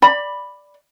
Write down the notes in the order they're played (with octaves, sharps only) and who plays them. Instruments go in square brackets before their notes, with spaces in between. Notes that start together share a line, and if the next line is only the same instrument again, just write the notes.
[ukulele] D5 B5